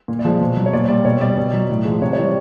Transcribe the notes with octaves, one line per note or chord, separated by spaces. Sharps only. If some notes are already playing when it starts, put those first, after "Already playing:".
A#2
D5
F3 G#3
B2
F#3
C#5
A#2 D5
G3 D5
B2 C#5
G3 D5
B2
F#3
A2
F3 G#3
C3 C#5
C#5
E3 G3 D5